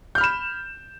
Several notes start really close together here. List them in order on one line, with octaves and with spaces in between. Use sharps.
G6 F6 B5 E7